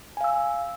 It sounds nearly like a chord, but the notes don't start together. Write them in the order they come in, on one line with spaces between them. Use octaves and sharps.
G#5 F5 E6